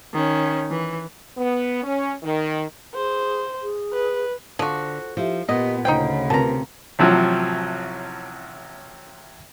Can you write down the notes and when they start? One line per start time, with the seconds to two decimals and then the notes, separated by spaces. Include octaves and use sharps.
0.13 D#3 C#4
0.71 E3
1.37 B3
1.82 C#4
2.23 D#3
2.95 G#4 C5
3.62 G#4
3.93 B4
4.59 D3 F3 F#4
5.17 F3 E4 G4 E5
5.49 A#2 B3 G4 D#5
5.85 D2 C#3 D#4 C5 C#5 F#5 G5 B5
6.30 C3 F4 A#4 B4 A5 A#5
6.99 A1 C3 F3 F#3